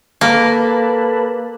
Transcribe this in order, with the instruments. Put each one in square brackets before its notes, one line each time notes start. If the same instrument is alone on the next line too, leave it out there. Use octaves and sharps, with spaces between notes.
[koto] A#3 [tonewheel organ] A4 B4